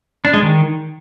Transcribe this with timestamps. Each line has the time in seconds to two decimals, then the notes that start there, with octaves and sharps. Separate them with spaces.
0.25 D4
0.33 G#3
0.42 D#3